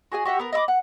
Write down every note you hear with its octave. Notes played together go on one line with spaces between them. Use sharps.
F#4 G#4 D#5 G#5
F#4 G4 E5 F#5
B3 A#4
D#5 E5 B5 D6
F#5